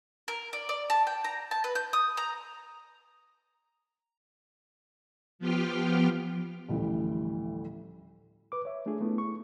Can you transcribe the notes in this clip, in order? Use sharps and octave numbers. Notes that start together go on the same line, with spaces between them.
A#4
D5
D5
A5
G5
A#5
A5
B4
G6
D#6
A#5
F3 B3 F4 G4 G5 F6
A1 D2 E3 F3 G3
B4 D6
C#5 E5
A3 D4 F4 G#4
A3 B3 E4
C#6